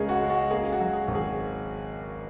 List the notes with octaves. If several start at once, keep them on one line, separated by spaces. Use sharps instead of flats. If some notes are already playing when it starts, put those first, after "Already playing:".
Already playing: C#2 C#3 G#3 C#4 G#4 A#4 D#5
F#4
G#3
F#4
A#3 G#4
G#4
F#4
F#3
G#4
G#1
G#4